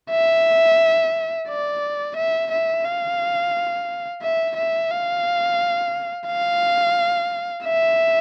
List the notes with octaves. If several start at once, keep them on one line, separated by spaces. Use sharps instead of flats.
E5
D5
E5
E5
F5
E5
E5
F5
F5
E5